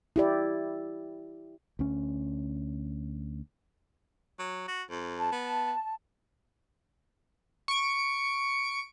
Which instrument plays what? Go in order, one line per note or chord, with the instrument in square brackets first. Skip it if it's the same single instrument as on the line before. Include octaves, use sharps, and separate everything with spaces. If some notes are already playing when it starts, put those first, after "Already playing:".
[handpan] E4 G4 D5
[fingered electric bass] D2 C#4
[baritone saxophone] F#3
F#4
F2
[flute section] A5
[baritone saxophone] B3
[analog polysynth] C#6 D7